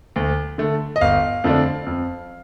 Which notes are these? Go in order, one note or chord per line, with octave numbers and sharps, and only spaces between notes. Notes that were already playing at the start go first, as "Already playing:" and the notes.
D2
D3 A3
D#5
G1 F5
F2 D3 A3 D4
F2